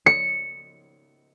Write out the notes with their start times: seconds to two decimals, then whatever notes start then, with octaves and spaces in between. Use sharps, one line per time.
0.06 C#7